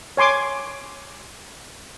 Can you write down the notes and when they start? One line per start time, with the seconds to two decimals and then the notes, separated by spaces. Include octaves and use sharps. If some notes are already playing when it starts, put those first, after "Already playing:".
0.17 C#5 G#5 C6 D6